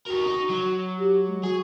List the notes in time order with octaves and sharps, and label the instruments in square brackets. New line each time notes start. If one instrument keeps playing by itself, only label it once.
[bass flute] F#4 [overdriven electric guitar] G4 A#4
[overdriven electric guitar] D#4
F#3
[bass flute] G4
G#3
[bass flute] F#4 [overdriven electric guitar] G#4